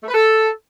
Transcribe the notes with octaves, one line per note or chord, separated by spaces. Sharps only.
A3
B4
A4